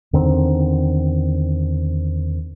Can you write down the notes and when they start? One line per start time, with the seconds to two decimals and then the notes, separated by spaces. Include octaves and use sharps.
0.13 E2 D3 D#3 C4